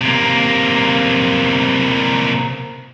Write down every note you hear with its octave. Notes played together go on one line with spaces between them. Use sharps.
C3 A#3